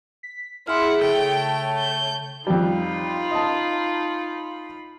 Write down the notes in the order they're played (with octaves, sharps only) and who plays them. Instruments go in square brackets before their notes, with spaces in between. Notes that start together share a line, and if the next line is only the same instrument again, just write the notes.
[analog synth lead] B6
[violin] E4 F#5 [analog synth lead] G#4 [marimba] C6 F6
[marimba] C#3 [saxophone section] A3 C#5 [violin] G5
[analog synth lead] A5
[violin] G6
[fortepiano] F2 G3 [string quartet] D#4 F4 B5
[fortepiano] D#5 A5